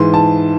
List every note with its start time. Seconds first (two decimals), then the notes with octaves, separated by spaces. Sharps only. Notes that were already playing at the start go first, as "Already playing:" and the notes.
Already playing: G#2 E3 C6
0.14 A5